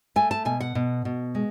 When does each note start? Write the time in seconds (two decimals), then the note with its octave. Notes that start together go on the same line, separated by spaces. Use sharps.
0.16 A3 G#5
0.31 A5
0.45 B2 G#5
0.60 F#5
0.75 B2
1.05 B2
1.35 G#3